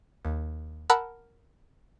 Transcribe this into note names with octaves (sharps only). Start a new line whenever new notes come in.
D#2
A#4 F#5 A5 B5 E6 F#6